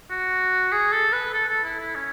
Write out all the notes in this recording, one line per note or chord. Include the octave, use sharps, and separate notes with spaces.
F#4
G#4
A4
B4
A4
A4
E4
E4
C#4